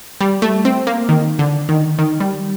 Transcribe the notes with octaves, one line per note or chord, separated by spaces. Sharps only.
G3
A3
C4
A#3
D#3
D3
D#3
D#3
G3